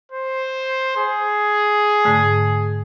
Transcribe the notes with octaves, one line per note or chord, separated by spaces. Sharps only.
C5
G#4
G#2 D3 A3